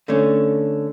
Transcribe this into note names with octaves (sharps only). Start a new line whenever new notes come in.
D3 A3 C#4